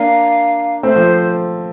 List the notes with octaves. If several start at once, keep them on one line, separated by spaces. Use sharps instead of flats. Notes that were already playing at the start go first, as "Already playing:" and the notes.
Already playing: A#3 D4 F5
A3 C4 C5
F3 A3